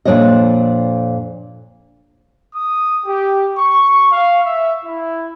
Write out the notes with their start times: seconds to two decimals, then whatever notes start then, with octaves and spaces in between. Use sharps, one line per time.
0.05 F2 A#2 F3 D4 C#5 D#5
2.55 D#6
3.06 G4
3.56 C#6
4.12 F5
4.44 E5
4.84 E4